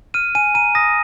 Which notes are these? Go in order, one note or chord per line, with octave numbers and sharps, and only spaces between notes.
F6 D#7
G#5 D#7
A#5 D#7
D#6 A#6